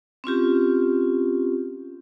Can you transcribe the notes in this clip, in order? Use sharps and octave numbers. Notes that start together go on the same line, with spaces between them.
C4 C#4 F4 G4